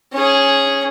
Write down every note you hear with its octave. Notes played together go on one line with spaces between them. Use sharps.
C#4 G#4